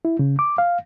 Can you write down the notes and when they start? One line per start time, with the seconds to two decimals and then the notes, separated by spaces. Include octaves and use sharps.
0.05 E4
0.19 C#3
0.39 D6
0.58 F5